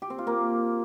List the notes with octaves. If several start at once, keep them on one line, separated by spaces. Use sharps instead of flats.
G4
C4
F4
A#3